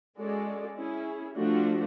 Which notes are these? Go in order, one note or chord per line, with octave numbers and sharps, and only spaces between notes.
G#3 C#4 F#4 A4 D5
C#4 E4 G#4
F3 A3 D4 F#4